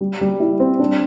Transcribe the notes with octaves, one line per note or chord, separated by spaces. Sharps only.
G3
G3
E4
C4
D4